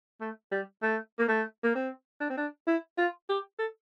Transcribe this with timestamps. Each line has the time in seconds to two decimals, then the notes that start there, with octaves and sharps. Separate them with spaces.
0.21 A3
0.51 G3
0.82 A3
1.19 A#3
1.28 A3
1.63 A#3
1.75 C4
2.20 D4
2.30 C4
2.37 D4
2.67 E4
2.98 F4
3.29 G4
3.59 A4